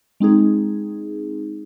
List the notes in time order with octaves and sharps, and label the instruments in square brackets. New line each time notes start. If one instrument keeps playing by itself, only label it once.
[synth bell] G#3 C4 D#4 G#4